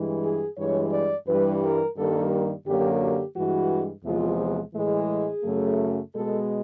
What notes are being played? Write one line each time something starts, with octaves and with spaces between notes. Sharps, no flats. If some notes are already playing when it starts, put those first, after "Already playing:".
Already playing: G2 E3 G#3
G#4
G2 E3 G#3 C#5
D5
G2 E3 G3 B4
A#4
G2 D#3 G3 A#3 A4
F#2 D3 F#3 A#3 G4
G4
G2 E3 G#3 F#4
E2 C3 F3 G#3 F4
A2 E3 G#3
G#4
F#2 C#3 F#3 A3
B2 G#3 A4